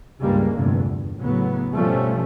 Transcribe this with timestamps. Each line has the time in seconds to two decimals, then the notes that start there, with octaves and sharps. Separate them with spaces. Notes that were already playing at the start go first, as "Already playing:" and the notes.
0.21 C#2 G2 C#3 G3 G#3 A#3
0.56 F1 E2 G2 D3
0.86 G2
1.19 A2 C#3 F#3 B3
1.73 G2 B2 F3 G3 A3 C#4